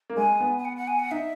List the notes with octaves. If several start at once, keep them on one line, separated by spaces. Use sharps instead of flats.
A#3
G#3 G#5
B3
G#5
F#5
F#5
G#5
F#5
D#4 E5